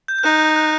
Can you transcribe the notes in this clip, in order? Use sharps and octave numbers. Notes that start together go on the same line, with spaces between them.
G6
G6
D#4 F#6
F#6